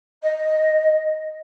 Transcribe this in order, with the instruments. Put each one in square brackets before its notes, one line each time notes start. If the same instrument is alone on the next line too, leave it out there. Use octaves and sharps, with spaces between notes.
[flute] D#5